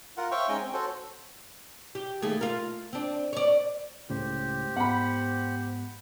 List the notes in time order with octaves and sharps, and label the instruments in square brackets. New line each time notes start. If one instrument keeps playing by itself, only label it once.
[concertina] F4 A#4 F#5
C5 C#5 E5 F5 G5 C#6
G#3 C#4 D#4 D#5 G5 G#5
C4
F#4 A4 C5 C#5
[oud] G4
D#2 A3 G#4
F4 A#4
C4 D4
C#5 D5
[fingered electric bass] C#2 A2 C#3 [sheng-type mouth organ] G4 C5
[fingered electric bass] G#2 B3 [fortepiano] F#5 B5